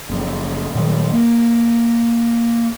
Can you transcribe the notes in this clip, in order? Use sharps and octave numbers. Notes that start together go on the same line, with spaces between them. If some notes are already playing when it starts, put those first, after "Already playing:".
F#1 C#3 F3
A#2 D#3 F#3 G3
A#3